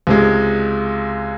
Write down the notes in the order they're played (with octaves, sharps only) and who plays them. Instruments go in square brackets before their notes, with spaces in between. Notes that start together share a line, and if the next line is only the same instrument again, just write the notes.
[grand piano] C#2 C3 G#3